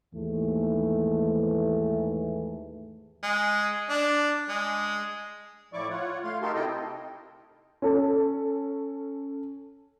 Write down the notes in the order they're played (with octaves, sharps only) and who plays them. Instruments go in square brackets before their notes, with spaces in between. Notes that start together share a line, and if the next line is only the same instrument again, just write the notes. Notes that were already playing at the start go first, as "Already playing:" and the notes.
[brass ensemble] D#2 G#2 E3 A3
[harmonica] G#3
D4
G#3
[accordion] A2 F3 E4 D5 C#6 D6
F4 C#5 F#5
A3 F5 C6
D#4 F#4 G4 A4 A#4 C6
C3 D#4 E4 A4 D#5 G5
[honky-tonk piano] C#4 A4